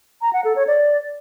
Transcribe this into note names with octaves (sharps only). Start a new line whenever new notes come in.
A#5
F#5
A4
C#5
D5